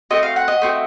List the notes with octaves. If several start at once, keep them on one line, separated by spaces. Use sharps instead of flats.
A3 C4 F#4 D#5
F5
F#5
D#5
A3 C4 F#4